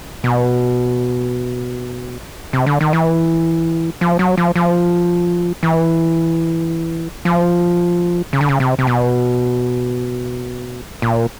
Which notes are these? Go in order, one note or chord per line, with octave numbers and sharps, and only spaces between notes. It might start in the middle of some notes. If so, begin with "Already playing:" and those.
B2
C3
D3
D#3
E3
F3
F#3
F3
F3
E3
F3
C#3
D3
C#3
C3
C3
B2
A#2